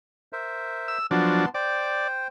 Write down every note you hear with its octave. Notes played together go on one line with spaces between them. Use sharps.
A#4 C5 E5
E6
F3 F#3 B3 D4 A5 C6
C5 D5 G5